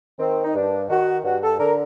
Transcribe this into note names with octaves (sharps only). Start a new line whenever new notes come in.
D#3 C4
D#4
G2 D4
D#3 F#4
G2 F#4
A4
D3 A#4